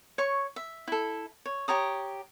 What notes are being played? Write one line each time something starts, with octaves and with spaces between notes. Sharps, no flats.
C#5 C#6
E5
E4 A4
C#5
G4 C#5 A#5 D#6